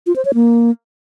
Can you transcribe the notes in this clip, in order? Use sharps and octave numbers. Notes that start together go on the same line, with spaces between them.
F4
C5
C#5
A#3